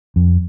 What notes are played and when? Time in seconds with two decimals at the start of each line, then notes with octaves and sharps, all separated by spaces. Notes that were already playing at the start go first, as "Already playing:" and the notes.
0.16 F2